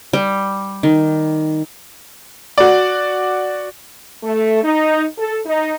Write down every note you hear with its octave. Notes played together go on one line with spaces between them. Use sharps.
G3
D#3
F#4 D5
A3
D#4
A4
D#4